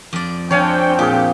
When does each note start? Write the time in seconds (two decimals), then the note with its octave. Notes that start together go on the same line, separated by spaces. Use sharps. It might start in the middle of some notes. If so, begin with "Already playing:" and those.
0.13 F2 D5
0.51 F3 C4 D4 C#5 F5 G5 G#5
0.99 A#2 G4 G#4 D6